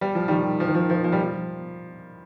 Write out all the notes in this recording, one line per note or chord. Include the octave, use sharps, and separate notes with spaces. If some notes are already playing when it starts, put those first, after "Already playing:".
G3
F3
D#3 G3
F3
D#3
F3
F3
F3
G3
F3